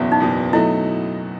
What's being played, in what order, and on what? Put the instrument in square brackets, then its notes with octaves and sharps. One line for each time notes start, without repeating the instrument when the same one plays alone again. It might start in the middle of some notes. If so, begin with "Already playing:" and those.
Already playing: [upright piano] F#1 E2 B2
[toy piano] D#4
[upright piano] F#1 E2 B2
[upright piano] B2 F#3 A3 D#4 [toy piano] E4